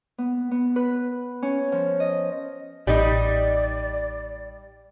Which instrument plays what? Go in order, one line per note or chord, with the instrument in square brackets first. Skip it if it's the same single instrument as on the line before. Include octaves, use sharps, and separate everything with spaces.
[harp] B3
B3
B4
C#4
F3
D#5
[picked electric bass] A1 [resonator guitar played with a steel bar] G3 D#4 D#5 [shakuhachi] D5